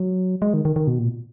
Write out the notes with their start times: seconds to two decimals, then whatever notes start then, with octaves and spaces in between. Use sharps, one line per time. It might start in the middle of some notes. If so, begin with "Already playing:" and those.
Already playing: F#3
0.42 G#3
0.54 D#3
0.65 D#3
0.76 D#3
0.87 B2
0.99 A#2